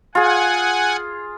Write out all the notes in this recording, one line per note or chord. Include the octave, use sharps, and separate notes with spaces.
F4 G#4 F#5 G#5